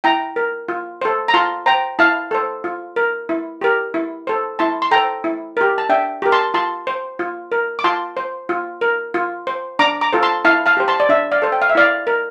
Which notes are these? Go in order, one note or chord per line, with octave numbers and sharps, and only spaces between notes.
E4 G5 A#5
A#4
F4
A4 C5
A#5
F4 A5 C6
C5 G5 A#5
E4 F5 A5
A4 C5
F4
A#4
E4
G4 A#4
E4
A4 C5
E4 A5 C6
C6
A4 C5 G5 A#5
E4
G4 A#4
A5
D4 E5 G5
G4 A#4
A5 C6
F4 A5 C6
C5
F4
A#4
D6
F4 A5 C6
C5
F4
A#4
F4
C5
D4 A#5 D6
A#5 D6
F4 A4 C5
A5 C6
E4 F5 A5
F5 A5
G4 C5
A5 C6
D5
D4 E5
D5 F5
A4 C5
G5
F5
E5
E4 D5 F5
A#4